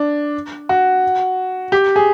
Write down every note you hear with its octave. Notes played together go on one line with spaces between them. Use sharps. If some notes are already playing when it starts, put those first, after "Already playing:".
Already playing: D4
F#4
G4
G#4